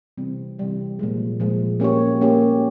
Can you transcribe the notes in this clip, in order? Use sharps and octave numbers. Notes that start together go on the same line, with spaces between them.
C3 E3 G3 C4
C3 E3 G3 C4
A#2 F3 G#3
A#2 F3 G#3
A#3 C#4 G4 C#5
A#3 C#4 G4 C#5